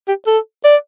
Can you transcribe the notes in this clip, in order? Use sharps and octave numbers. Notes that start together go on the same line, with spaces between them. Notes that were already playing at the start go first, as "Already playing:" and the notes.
G4
A4
D5